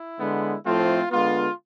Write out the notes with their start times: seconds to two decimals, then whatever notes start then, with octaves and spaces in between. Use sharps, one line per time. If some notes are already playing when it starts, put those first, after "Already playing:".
Already playing: E4
0.19 D3 G#3 B3
0.64 A2 F3 A3 C4 F4
1.11 D3 G#3 B3 F4